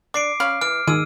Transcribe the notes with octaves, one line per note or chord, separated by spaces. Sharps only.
D4 D6 C7 D7
C#4 F5 B5
E3 F6 D7
D#3 G#4 E6 D#7